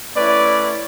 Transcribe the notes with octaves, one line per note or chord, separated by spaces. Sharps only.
A3 C#4 E4 B4 D5